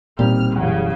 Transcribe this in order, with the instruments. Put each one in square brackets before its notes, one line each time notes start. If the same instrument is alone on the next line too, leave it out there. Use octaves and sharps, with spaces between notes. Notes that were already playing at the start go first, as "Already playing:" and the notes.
[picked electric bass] E1 G3 [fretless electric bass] A#2 [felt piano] C4 D#4 [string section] F6
[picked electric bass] E1 F#2 [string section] C#3 [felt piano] E3 G3 F#5